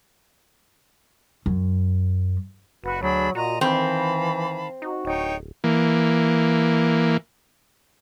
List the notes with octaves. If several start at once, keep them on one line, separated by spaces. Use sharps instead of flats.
F#2
F#1 F#4 B4
D2 F#3 D4 G#4 B5
A#2 F#4 D#5 A#5
D#3 E3 C4 F5 A5 B5
D#4 F#4
D1 D#4 C#5 G5
E3 A#3